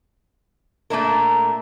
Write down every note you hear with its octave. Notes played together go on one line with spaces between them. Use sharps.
A#2 A3 A#3 D4 E4 A#4